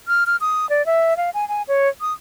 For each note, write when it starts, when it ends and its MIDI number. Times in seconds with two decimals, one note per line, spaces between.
0.08 0.24 89
0.26 0.36 89
0.41 0.69 87
0.70 0.85 74
0.86 1.17 76
1.17 1.30 77
1.34 1.48 80
1.48 1.62 80
1.68 1.89 73
2.01 2.13 87